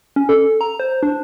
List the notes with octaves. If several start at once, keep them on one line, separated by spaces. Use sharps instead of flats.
C#4
A4
A#5
C5
D4